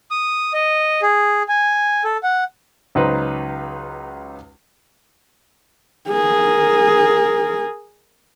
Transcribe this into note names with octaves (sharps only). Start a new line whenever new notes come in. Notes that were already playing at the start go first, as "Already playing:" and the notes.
D#6
D#5
G#4
G#5
A4
F#5
C#2 F#3 D#4 B4 C5
G#4 A#4